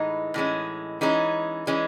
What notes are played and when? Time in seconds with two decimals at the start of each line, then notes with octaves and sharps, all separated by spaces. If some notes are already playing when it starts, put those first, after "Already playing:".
Already playing: A2 E3 G#3 D#4
0.34 A2 E3 G#3 C#4
1.01 E3 G#3 C#4 D#4
1.67 E3 G#3 C#4